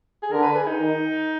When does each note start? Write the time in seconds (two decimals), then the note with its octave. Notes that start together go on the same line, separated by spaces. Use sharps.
0.23 G#4
0.32 D3 A#4
0.43 B4
0.56 G#4
0.67 D#4
0.79 D#3